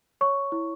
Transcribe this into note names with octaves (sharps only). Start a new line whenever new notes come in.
C#5 C#6
E4